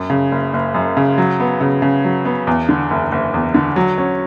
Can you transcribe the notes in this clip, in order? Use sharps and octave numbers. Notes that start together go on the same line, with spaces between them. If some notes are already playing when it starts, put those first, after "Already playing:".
Already playing: F#2
C#3
F#1
F#1
F#2
C#3
F#3
B3
C#3
C#3
F#3
B3
E2
D3
F#1
F#1
E2
D3
F#3
C#4